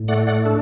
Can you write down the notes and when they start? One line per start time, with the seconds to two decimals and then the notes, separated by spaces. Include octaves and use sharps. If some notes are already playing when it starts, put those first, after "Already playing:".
Already playing: A2
0.08 A3 D5 F#5
0.27 D5 F#5
0.46 D4 A4